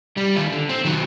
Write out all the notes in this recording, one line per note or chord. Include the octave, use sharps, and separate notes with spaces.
G3
D#3 F4
D3
C4
D#3 F#3